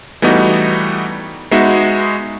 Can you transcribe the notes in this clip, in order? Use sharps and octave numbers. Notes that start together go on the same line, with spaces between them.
E3 G3 A3 B3 D#4 F#4
G#3 B3 D#4 F#4 E5